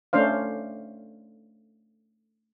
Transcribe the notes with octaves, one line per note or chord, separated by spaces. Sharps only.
A3 C#4 D4 C5 F5